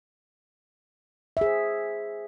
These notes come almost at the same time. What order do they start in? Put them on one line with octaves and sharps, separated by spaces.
E5 G#4 C5